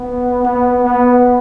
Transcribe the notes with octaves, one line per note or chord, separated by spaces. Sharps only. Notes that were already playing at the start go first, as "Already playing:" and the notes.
Already playing: B3
B3
B3